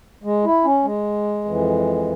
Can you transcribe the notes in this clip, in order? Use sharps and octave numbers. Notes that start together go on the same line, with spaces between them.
G#3
E4
C#4
G#3
F2 E3